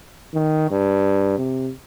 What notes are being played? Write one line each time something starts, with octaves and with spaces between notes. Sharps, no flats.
D#3
G2
C3